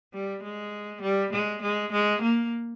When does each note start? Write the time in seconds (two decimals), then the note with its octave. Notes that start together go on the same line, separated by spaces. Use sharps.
0.13 G3
0.43 G#3
1.02 G3
1.33 G#3
1.62 G#3
1.92 G#3
2.22 A#3